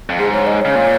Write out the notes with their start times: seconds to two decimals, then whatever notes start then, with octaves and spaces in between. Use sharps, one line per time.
0.10 F2
0.19 G#2 G#4
0.33 C#5
0.47 D#5
0.61 C#3 C#5
0.75 A#2